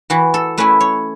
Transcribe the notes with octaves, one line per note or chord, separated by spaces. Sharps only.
E3 F#4
A4
A3 C#4 E4 B4
C#5